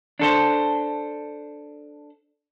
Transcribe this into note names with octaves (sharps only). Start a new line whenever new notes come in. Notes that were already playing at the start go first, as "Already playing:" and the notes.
D4 A4 C5